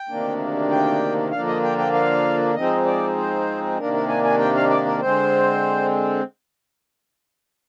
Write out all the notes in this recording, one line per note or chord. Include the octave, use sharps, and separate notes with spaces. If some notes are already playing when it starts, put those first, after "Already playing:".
Already playing: G5
D2 C3 D#3 A#3 D4
G5
D3 F3 A#3 D4 F5
D#5
G5
G5
F5
G#2 F3 G#3 C4 D#4 D#5
D5
C5
C3 D#3 A#3 D4 A#4
A#4
G#5
G#5
G5
F5
D5
A#4
D3 G#3 C4 C5